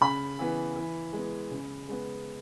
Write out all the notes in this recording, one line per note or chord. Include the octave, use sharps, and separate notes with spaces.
C#3 B5
E3 B3
E3
G#3 B3
C#3
G#3 B3